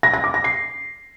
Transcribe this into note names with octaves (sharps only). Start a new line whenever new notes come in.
A#6
A#6
D6
A#6
C7